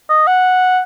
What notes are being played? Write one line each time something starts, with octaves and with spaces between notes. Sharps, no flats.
D#5
F#5